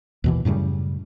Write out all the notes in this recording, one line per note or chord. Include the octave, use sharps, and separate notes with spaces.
D#2 B2 E3
F#2 A2 C#3 G3